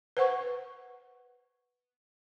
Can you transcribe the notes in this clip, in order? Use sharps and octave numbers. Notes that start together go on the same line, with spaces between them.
B4 C5 F#5 C#6